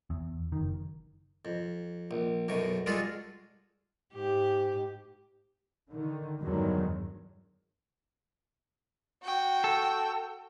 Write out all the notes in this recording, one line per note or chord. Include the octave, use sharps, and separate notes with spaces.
E2
F#1 D#3
F2
A#1
B1 F#2 B2 C#6
G3 G#3 F4 F#4 G#4 A4
G#2 G4
D3 D#3
E2 G2 D3 D#3 F#3 G#3
F#4 G5
A4